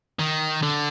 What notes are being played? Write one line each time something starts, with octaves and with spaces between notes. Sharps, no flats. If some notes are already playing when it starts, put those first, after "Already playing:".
D#3
D3